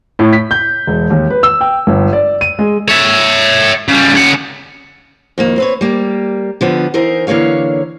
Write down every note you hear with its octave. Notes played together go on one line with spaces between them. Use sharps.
A2
B6
G6
E1
D#2
B4
E6
G5
G1
D5
D#7
G#3
C#5 E5
C#3 G3
C#3 F#5
F2 D#3 A#3
C4 B4 C#5
G3 A#3
D3 F3 B3
E3 D#4 A#4 C5
D3 E3 A#3 C#5 F5